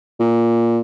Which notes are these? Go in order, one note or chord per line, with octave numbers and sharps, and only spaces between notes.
A#2